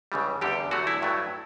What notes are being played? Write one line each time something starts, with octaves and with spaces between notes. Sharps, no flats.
C#2 C#3 E3 G3
E2 D3 G3 G4
E2 D3 F#3 A3 F#4
E4
G2 F#3 A3